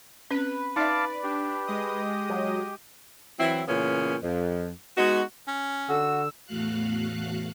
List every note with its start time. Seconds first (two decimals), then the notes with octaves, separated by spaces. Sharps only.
0.31 C4 C#4 B4
0.76 D#4 D5 E5 F5 A5 D6
1.23 D4 G4
1.67 G#3 D#5 D#6
2.30 F#3
3.38 E3 F#3 C4 E4
3.68 A#2 C#3 E3 B3 C#4
4.23 F2
4.97 G#3 B3 D#4 F#4
5.48 C#4
5.89 D3 F#4 E6
6.46 E2 A2 A3 F#4 F5 F#6